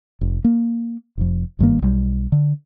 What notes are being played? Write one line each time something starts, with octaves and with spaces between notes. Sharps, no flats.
F1
A#3
F1 F2
F#1 G2 D#3 A#3
B1 G3
D3